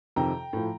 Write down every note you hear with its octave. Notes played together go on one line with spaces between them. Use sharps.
F2 C3 D#3 G5 A#5
A2 F3